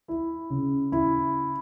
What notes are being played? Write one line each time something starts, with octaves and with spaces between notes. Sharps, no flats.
E4
C#3
E4